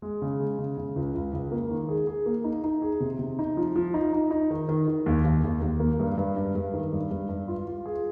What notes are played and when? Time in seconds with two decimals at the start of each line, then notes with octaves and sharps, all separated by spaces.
0.02 G#3
0.22 C#3
0.40 G#3
0.58 C#3
0.78 C#3
0.96 C#2
1.15 C#2
1.33 C#2
1.51 A#3
1.70 D#3
1.89 G#4
2.07 G#4
2.26 A#3
2.44 D#4
2.64 D#4
2.82 G#4
3.00 C3
3.19 C3
3.39 D#4
3.57 F3
3.76 F3
3.94 D#4
4.13 D#4
4.31 D#4
4.51 D#3
4.69 D#3
4.88 D#3
5.06 D#2
5.24 D#2
5.44 D#2
5.61 D#2
5.80 A#3
5.99 G2
6.18 G2
6.37 G2
6.55 G2
6.74 D#3
6.93 G2
7.11 G2
7.29 G2
7.48 F4
7.67 F4
7.86 G#4